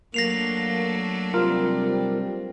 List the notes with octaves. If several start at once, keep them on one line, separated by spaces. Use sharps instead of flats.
F#3 A3 A#3 D4 A#6 C7 F7
C3 G3 C4 F4 A#4